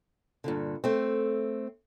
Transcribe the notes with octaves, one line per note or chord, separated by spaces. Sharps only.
G2 A#2 D3
A3 C4